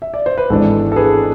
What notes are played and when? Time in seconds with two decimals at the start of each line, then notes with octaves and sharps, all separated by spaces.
0.02 E5
0.14 D5
0.26 C5
0.38 B4
0.50 G#1 G#2 E3 B3 D4 A4
0.92 A4
0.96 G#4 B4